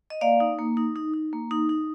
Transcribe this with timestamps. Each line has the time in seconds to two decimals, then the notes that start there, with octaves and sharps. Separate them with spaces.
0.10 D#5
0.21 A#3 D5 F5
0.40 D#4
0.59 A#3
0.77 D#4
0.96 D#4
1.14 D#4
1.33 A#3
1.51 D#4
1.69 D#4